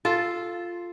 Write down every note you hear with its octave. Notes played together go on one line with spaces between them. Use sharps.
F4 A4